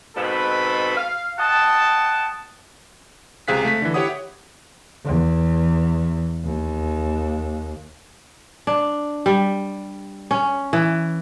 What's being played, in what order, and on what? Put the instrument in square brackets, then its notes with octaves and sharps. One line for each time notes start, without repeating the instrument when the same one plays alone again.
[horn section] G#2 B2 C4 A4 B4 B5
F5
D#5 F#5 G5 A5
[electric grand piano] C#2 C3 G#4 F5 F#6 B6
A3 B6
D3 E3
E4 G4 C#5 F#5 D#6
[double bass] E2
D#2
[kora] D4
G3
C#4
E3